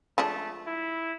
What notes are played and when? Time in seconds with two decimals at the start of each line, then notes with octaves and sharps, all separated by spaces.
0.18 F3 G#3 A3 D4
0.67 E4